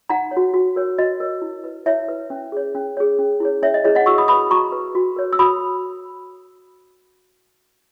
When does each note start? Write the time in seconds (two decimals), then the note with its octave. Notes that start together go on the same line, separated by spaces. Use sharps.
0.09 D#4 F#5 A#5
0.31 C#5
0.37 F#4
0.54 F#4
0.76 A#4 C#5
0.98 F#4 D#5
1.20 A#4 C#5
1.42 E4
1.64 B4
1.86 E4 C#5 E5
2.08 B4
2.30 C#4
2.52 G#4 C#5
2.75 C#4
2.97 G#4 C#5
3.19 C#4
3.40 E4 G#4 C#5
3.62 C#4 C#5 E5
3.74 D#5
3.84 E4 G#4 C#5 D#5
3.95 D#5 F#5
4.06 F#4 C#6 E6
4.18 B5 D#6
4.28 B4 B5 D#6
4.51 F#4 A#5 C#6
4.72 B4
4.95 F#4
5.16 A#4 C#5
5.33 E6
5.39 F#4 B5 D#6